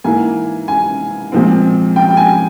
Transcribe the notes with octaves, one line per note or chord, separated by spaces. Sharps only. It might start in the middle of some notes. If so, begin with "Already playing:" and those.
G#2 E3 A#3 G#5
G#5
A#2 F3 G#3 C4
G5
G5
G#5